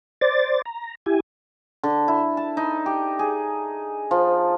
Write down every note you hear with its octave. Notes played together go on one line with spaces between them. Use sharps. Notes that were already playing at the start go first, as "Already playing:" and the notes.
C5 D5 A6
A#5
E4 G4 G#5
D3
E4
A5
D#4
G4
G#4
F3